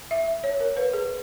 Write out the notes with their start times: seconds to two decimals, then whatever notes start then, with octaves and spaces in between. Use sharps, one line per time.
0.11 E5
0.44 C#5
0.60 A#4
0.77 B4
0.93 G#4